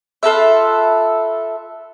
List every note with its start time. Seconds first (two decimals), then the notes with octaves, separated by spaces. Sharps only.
0.23 F4 A4 B4 E5